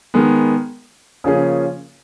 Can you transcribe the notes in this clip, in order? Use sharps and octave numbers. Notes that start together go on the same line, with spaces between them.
D#3 G#3 B3
C#3 F3 A#3 C#4 G#4